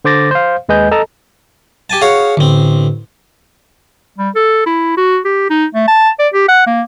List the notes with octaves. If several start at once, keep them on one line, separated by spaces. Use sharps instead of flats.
D3 C5 D6 A6 A#6
C5 F5
D#2 G#3 B4 D#5 G#5 G6
A4 D#5 A5 A#5
G4 G#5 A5
F#4 G#4 C#5 F5
A1 D3 C4
G3
A4
E4
F#4
G4
D#4
A3
A5
D5
G4
F#5
A#3